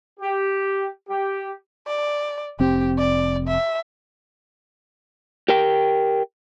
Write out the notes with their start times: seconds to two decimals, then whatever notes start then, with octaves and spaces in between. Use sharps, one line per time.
0.20 G4
1.08 G4
1.87 D5
2.60 F1 C4 G4
2.98 D5
3.48 E5
5.48 G4 A#4 G5